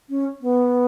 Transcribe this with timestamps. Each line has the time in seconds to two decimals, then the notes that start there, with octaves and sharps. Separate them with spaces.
0.09 C#4
0.42 B3